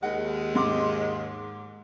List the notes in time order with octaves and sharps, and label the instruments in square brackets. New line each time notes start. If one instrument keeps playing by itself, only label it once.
[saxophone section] D#2 G#3 [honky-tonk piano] F#5
[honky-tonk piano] G#2 C6 D6